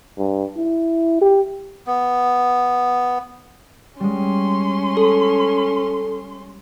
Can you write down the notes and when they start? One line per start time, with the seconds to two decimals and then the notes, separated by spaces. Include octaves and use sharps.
0.19 G2
0.57 E4
1.21 G4
1.87 B3
4.00 G3 G#3 C#4 C6
4.97 A4